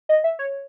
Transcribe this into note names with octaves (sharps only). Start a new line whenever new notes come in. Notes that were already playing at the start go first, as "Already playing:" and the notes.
D#5
E5
C#5